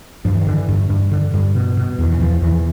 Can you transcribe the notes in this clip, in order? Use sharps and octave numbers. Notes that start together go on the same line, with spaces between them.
G2 F3
E3
D#3
D3 E3
G2
G2
D3
G2
B2
B2
E2 D#3
E3
E2 F3
E2 E3